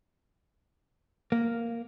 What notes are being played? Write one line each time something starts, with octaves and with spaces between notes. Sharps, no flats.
A#3